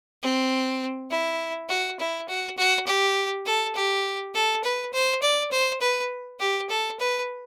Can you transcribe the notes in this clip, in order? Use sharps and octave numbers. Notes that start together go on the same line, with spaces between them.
C4
E4
F#4
E4
F#4
F#4
G4
A4
G4
A4
B4
C5
D5
C5
B4
G4
A4
B4